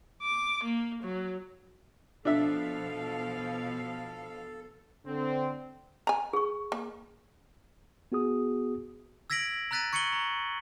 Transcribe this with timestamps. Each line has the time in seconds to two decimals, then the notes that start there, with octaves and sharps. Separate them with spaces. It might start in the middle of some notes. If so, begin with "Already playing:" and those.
0.22 D6
0.64 A#3
1.03 F#3
2.25 B2 F3 D4 A4 E5 F5
5.06 D3 C4
6.07 G#5 A#5
6.33 G#4 C#6
6.72 A#3
8.12 B3 F#4 G#4 D#6
9.30 E6 G#6 A#6 B6 D7 F#7
9.71 A#5 E6 F#6 A6 B6 D#7
9.93 C#6 G#6 C#7 D#7 F#7 G7
10.13 A#5